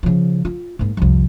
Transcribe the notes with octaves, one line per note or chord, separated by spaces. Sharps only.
C#3 F3
F4
G#2 A#3
C2 F2